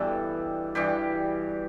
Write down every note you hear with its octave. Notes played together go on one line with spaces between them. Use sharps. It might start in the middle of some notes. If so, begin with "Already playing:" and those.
Already playing: G2 B2 E3 G3 A4 B4
G2 E3 G3 G4